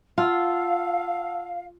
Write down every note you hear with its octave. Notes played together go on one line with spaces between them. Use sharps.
F4 F5 F#5 A5 E6